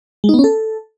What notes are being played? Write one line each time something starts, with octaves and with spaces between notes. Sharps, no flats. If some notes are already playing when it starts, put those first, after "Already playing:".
G#3
D#4
B3
C#4
A4